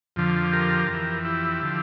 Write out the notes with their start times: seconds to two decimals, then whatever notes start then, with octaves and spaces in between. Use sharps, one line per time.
0.16 F2 D3 F3
0.52 G4 A#4
0.88 F2 E3
1.25 E4 G4
1.63 D3 F3